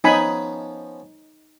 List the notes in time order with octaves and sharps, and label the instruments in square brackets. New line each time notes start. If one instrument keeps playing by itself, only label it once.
[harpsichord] F3 B3 C#4 [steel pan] D#4 G#5 B5